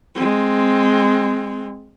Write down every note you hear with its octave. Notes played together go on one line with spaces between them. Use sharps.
G#3 C4